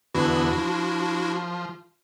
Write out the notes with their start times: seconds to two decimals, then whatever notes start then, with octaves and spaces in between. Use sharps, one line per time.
0.15 E2 D3 B3 D4 E4 F#4
0.58 F3